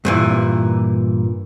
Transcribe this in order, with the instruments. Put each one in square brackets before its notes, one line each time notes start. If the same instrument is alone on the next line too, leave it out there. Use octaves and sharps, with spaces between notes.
[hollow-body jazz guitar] G2 A#2 E3